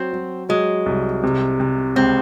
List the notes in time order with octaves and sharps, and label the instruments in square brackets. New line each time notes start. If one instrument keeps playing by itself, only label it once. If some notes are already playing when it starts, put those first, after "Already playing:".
Already playing: [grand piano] F#3 [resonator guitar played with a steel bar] C4
[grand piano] F#3
[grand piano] F#3 [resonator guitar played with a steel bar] G#3
[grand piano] C2
C3
C3
[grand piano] C#2 [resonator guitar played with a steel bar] C4